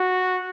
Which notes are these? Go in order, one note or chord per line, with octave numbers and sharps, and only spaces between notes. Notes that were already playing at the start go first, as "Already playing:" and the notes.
Already playing: F#4